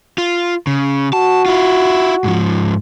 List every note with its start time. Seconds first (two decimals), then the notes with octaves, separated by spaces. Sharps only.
0.18 F4
0.67 C#3
1.13 F#4 A5
1.46 E4 F4
2.24 G#2 F3